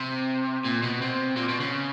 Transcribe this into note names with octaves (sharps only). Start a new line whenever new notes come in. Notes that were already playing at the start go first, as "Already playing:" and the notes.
Already playing: C3
A#2
B2
C3
A#2
B2
C#3